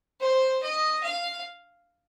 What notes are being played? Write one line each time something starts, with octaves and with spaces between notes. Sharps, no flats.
C5
D#5
F5